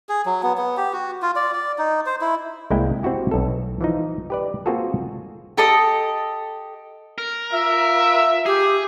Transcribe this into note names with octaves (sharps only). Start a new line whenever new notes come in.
G#4
F#3
B3
B3
G4
F#4
F4
D5
D5
D#4
C5
E4
C2 G#3 A#3 E4 G5
C4 E4 F#4 G4
B1 A4
E3 F3 D#4
G4 B4 D5
A#3 C4 F4 F#4 G#4 A4
G4 A4 D#5 D#6
A#4
F4 E5
G4 G#4